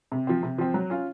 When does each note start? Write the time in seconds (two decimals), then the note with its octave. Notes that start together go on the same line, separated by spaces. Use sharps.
0.12 C3
0.27 F3 C4
0.43 C3
0.58 F3 C4
0.74 F#3
0.90 C#4 F4